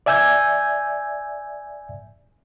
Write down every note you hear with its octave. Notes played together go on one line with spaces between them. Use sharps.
D5 E5 G#5 E6 G6 G#6